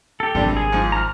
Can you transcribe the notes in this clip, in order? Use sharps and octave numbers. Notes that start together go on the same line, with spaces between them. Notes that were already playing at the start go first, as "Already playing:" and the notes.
G4 A4
D1 G#1 C3 G3 D4
G#4
G#2 F3
A#5 F6